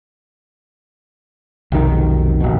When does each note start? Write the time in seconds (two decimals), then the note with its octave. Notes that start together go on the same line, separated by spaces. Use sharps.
1.72 F1 B1 D#3
2.41 D#1 A#1 B2